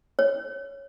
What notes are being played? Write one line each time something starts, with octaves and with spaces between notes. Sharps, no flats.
C#5